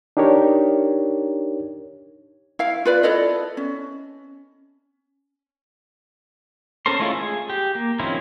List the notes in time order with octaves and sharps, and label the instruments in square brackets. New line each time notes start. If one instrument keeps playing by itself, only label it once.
[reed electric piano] D4 D#4 G4 A#4 C#5
[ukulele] E4 F5
F4 B4 D5
E4 A4 D5 D#5
C#4
[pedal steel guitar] C#4 A4 A#4 C5 C6
G#3 A3 C#4 E4 F4
G#4
G4
A#3
D#3 F3 C4 C#4 E4